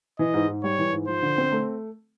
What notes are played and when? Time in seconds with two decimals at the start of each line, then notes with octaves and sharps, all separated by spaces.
0.19 E3 D#5
0.34 G#2
0.48 G#2
0.63 G3 C#5
0.79 E3
0.93 G#2
1.08 F3 C5
1.22 D3
1.38 C4
1.52 A3